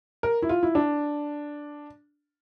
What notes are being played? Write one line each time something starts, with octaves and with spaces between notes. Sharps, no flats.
A#4
E4
F4
E4
D4